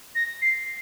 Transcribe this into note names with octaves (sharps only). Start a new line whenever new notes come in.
A#6
C7